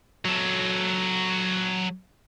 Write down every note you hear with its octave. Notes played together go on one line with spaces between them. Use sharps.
F#3 A4